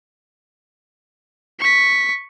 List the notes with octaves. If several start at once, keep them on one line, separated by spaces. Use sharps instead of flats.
C#6 B6